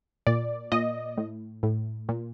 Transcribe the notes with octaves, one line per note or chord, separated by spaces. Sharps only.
A#2 D5
A#2 D#5
A2
A2
A#2